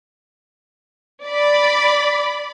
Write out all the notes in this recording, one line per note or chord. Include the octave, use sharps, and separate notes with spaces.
D5 B5